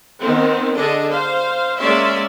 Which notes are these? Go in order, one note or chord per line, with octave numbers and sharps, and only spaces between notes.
D#3 B3 C4
D3 D4 G#4 A4 D#5
C5 F5
G#3 A#3 C#4 D5 E5 C6